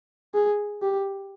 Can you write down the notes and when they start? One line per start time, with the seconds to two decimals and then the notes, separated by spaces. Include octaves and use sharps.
0.34 G#4
0.82 G4